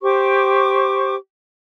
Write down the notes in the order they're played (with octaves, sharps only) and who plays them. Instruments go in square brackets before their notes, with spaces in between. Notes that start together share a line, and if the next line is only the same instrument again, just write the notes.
[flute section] G4 C5 C#6 D6